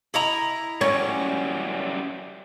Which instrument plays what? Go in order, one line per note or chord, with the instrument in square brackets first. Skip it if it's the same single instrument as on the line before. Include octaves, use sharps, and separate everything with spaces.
[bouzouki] E4 D#5 A#5
[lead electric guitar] F#2 G3 [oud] C#4